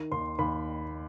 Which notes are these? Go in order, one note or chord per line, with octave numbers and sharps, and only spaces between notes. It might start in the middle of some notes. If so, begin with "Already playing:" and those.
Already playing: D#3
D#2 C6
D#2 B5